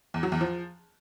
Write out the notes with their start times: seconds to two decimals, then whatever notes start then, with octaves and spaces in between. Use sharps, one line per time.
0.14 E2
0.23 F#3
0.32 E2
0.41 F3